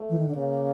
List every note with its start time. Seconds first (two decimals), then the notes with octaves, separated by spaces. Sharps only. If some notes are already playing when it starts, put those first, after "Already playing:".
Already playing: A3
0.09 E3
0.17 D#3
0.27 D3
0.35 C#3 A#3